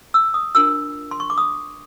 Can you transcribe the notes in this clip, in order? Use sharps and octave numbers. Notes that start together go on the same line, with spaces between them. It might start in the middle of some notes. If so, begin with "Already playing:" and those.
E6
D#6
D4 F4 A#4 E6
C6
C#6
D6
D#6